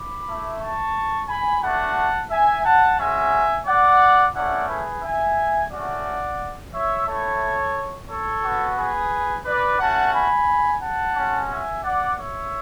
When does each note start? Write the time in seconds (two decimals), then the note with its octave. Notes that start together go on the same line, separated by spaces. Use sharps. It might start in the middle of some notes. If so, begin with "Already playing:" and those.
Already playing: B5 D6
0.27 A3 E4
0.61 A5 C#6
1.29 G#5 B5
1.63 A3 D4 F#4 F#5 A5
2.31 E5 G#5
2.64 F#5 A5
2.99 G#3 C#4 F#4 E5 G#5
3.67 D5 F#5
4.35 A3 C#4 E4 D5 F#5
4.69 G#4 B4
5.03 E5 G#5
5.71 A3 C#4 F#4 D5 F#5
6.73 C#5 E5
7.07 A3 E4 A4 C#5
8.09 A4 C#5
8.44 B3 F#4
8.77 G#4 B4
9.46 B4 D5
9.79 A3 C#4 F#4 F#5 A5
10.13 G#5 B5
10.81 F#5 A5
11.16 G#3 C#4 F#4
11.49 E5 G#5
11.83 D5 F#5
12.18 C#5 E5